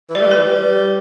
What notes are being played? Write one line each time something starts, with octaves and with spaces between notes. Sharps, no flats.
E3
G3 D5
A3
G3
B4
E3
G3